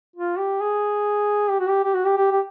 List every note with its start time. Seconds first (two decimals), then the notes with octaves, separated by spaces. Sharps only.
0.16 F4
0.38 G4
0.60 G#4
1.49 G4
1.60 F#4
1.68 G4
1.84 G4
1.94 F#4
2.05 G4
2.17 G4
2.31 G4